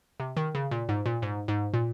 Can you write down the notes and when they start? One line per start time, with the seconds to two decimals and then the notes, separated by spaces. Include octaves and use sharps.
0.20 C3
0.37 D#3
0.55 C#3
0.71 A#2
0.89 G#2
1.06 A#2
1.22 G#2
1.48 G#2
1.74 A#2